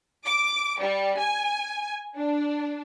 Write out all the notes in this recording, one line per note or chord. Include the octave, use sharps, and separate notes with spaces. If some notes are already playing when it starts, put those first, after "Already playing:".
D6
G3
G#5
D4